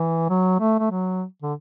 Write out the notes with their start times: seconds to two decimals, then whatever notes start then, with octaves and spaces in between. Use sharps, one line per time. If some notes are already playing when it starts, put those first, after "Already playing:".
Already playing: E3
0.29 F#3
0.60 A3
0.79 A3
0.91 F#3
1.43 D3